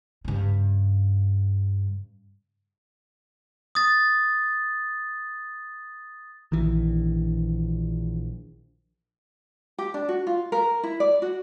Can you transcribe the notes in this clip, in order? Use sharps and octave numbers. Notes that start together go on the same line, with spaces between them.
G2 C#3
D#6 A6
A#1 D#3 E3
G4
D4
F#4
F4
A#4
E4
D5
F#4